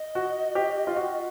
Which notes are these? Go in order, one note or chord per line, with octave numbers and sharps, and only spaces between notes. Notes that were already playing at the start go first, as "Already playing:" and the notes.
Already playing: D#5
F#4
G4
F4
F#4